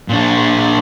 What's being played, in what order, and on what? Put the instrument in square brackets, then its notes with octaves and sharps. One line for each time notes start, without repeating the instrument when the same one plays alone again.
[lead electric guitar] A#2 D4